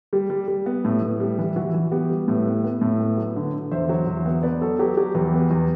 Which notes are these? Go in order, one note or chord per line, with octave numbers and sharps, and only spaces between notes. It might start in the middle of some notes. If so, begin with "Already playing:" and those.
G3 G4
G3
G3
B3
A2
A2
G3
E3
E3 F#4
E3
B3 G4
G3
A2
B3
B3
A2
B3
F#3
D3
D3
E2 C5 E5
F#3
E2
B3
B3 B4 D5
F#3 F#4 A4
F#3 G4
F#3 G4
E2 G4 B4
B3
E2